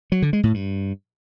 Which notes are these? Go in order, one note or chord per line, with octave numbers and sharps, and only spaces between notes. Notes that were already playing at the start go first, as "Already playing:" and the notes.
F#3
D3
G#3
A2
G2